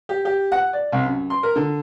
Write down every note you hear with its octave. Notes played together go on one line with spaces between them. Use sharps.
G4
G4
F#5
D5
C2
F#2
C6
A#4
D3